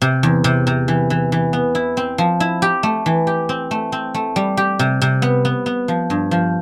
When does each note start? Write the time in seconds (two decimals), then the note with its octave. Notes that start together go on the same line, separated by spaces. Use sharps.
0.02 C3
0.23 E2
0.44 C3
0.67 C3
0.88 E3
1.10 E3
1.32 E3
1.53 B3
1.75 E4
1.97 C4
2.18 F3
2.40 E4
2.62 G4
2.83 A3
3.06 E3
3.27 G4
3.49 C4
3.71 A3
3.92 C4
4.14 A3
4.36 G3
4.57 G4
4.79 C3
5.02 C3
5.22 B3
5.45 B3
5.66 B3
5.88 F3
6.10 G2
6.31 F3